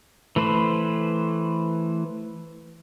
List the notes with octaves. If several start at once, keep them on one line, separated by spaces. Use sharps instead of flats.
E3 A3 B4 C5